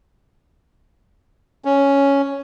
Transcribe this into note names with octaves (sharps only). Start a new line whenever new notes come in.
C#4